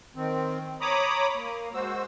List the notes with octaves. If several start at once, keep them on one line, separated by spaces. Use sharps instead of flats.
D#3 C4
C#5 A#5 B5 D6 D#6
A#3
G#3 F#4 C5 E6